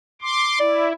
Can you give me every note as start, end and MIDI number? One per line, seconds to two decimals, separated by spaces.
0.22 0.59 84
0.22 0.59 86
0.60 0.93 64
0.60 0.88 74